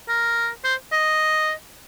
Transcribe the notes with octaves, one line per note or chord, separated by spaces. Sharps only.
A#4
C5
D#5